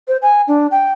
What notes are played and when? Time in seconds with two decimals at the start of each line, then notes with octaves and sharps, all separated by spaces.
0.08 C5
0.22 G#5
0.48 D4
0.71 G5